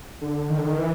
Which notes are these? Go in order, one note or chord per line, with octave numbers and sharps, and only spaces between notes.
D3
D#3
D3
D#3
E3